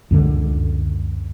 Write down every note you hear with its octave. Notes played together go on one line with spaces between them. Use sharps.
C#2 F#2 D3 G#3